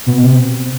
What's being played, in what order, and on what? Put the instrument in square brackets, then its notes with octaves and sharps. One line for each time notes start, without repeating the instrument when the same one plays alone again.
[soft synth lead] B2
C3